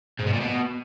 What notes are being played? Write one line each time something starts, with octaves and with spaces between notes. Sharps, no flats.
G#2
B2
A#2
B2